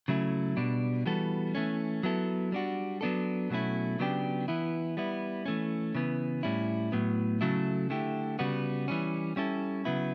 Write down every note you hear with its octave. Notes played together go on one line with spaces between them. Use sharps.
C#3 F#3 A3 C#4 E4
B2 G3 D4
E3 G3 B3 F#4 A4
E3 A3 C#4
F#3 B3 E4 A4
G3 D4 F#4
F#3 B3 D4 A4
B2 F#3 A3 C#4 E4
C#3 F#3 B3 D4 G4
E3 B3 E4
G3 B3 E4
E3 A3 C#4
C#3 E3 B3
A2 G3 C#4 E4
A2 F#3 B3
C#3 F#3 A3 E4 A4
D3 A3 E4 G4
C#3 G3 B3 F#4
E3 G3 C#4
G3 C#4 E4 A4
C#3 F#3 B3 E4